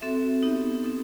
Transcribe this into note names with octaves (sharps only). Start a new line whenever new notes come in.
C4 F#4 A4 E5
B3 D#4 G4
C4 D#4 A4